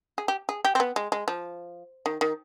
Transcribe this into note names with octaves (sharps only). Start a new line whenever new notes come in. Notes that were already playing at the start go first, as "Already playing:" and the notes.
G#4
G4
G#4
G4
C4
B3
G#3
G#3
F3
D#3
D#3